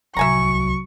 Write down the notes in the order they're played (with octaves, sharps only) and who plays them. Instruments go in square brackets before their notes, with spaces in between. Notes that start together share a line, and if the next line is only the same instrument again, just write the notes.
[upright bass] D1 C2 [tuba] F#3 [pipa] E5 G#5 A#5 [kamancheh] C#6